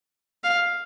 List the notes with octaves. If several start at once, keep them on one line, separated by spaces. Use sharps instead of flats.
F5